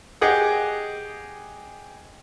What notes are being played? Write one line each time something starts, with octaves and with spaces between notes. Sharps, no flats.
G4 G#4 D#5 F#5